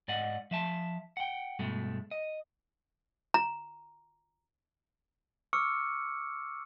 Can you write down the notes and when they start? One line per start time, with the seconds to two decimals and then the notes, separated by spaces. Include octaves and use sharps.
0.08 G#2 D5 D#5 F#5
0.51 F3 E5 A5
1.17 F#5 G5
1.59 G2 B2 G#3 A3
2.11 D#5
3.34 A#5
5.53 C#6 D6 E6 F6 C#7